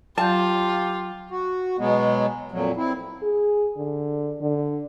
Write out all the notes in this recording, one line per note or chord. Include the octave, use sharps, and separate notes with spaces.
F#3 F4 G4 D5 A5 G6
F#4
B2 F#3 G#3 B3
F2 A#2 F3 F#3
C4 E4
G#4
D3
D3